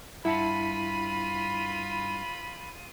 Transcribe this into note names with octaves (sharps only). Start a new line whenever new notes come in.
G2 E4 F4 F#5 A5 B5 D#7